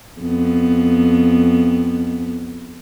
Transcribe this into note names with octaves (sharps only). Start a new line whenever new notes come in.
F2 B3